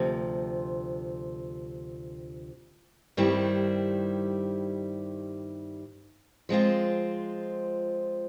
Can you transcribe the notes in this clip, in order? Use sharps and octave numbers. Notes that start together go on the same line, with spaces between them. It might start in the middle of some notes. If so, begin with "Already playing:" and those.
Already playing: D2 C3 F3
G2 D#3 G3 C4 E4
F3 G#3 C4 F4